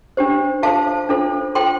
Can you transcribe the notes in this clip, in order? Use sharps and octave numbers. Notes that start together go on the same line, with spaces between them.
D4 G4 C5
F4 A4 C5 F5 A5
D4 F4 A4 C5
F4 A4 C5 G5 C6